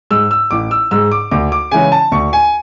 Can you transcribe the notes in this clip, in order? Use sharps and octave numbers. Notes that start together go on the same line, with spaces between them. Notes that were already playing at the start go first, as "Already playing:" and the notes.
G#2 G#3 E6
E6
A1 D6
E6
G#2 G#3 E6
D6
D2 D6
D6
C#3 E3 G#3 C#4 G#5
A5
D2 C#6
G#5